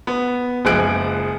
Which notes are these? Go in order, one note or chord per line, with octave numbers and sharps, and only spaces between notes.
B3
F#1 F3 G#3 G#4 F#6 D7